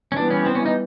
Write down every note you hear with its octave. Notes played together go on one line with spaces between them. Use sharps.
C#4
E3 G3 B3 D4
C#4
C4
C#4
D#4